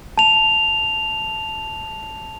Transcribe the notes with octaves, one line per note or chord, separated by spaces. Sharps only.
A5 F7